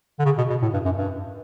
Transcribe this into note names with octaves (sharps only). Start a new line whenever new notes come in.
D3
C#3
B2
B2
A2
G2
F#2
G2